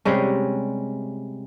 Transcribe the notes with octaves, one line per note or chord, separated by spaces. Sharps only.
C3 G3 G#3 C#4